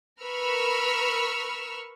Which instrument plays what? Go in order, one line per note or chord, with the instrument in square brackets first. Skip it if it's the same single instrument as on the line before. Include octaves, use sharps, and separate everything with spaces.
[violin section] A#4 B4 B5 C#6 E6 F6